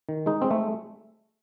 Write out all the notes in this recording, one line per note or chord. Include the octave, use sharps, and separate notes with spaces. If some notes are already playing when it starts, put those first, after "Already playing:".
D#3
G#3 D#4
G#3 C4
A3